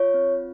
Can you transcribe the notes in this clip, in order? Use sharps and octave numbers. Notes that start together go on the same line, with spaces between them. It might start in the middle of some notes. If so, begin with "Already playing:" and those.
Already playing: F4 C#5
C4